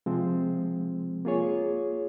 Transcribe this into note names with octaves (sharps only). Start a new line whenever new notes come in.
C3 F3 G#3 C4
A#3 F4 G#4 C#5